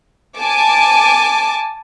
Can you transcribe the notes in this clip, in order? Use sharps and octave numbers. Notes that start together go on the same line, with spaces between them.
G#5 A5 D6